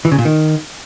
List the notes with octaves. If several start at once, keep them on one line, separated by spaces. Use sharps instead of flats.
E3
C#3
A#2
D#3